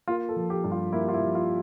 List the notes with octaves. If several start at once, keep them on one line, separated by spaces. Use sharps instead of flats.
A#3 F4
A4
F3
G4
G2
F4
A#3 E4
F4
E4
F3
F4